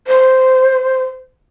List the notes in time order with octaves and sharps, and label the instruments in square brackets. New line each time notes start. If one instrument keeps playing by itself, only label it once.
[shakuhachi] C5